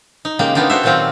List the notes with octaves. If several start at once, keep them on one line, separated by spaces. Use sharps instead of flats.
D#4
C#3 G#3 A#3 G4
B3 D4 D#4 F4 G4
F#4 G4 A4 C5 C#5 E5
A#2 D#3 F#3 C4 F4 G4